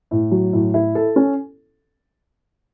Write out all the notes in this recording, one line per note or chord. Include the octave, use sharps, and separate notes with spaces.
A2
F#3
A2
E4
A4
C#4